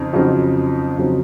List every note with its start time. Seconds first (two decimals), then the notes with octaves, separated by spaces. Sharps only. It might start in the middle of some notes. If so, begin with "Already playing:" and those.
Already playing: F2 C#3 C4 D#4
0.13 F2 C#3 F#3 C4 D#4
0.98 F2 C#3 F#3 C4 D#4